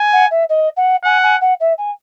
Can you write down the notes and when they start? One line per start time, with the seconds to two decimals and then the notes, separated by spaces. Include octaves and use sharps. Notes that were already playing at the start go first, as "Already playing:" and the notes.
Already playing: G#5
0.12 F#5
0.30 E5
0.49 D#5
0.76 F#5
1.04 F#5 G#5
1.23 G#5
1.41 F#5
1.60 E5
1.78 G#5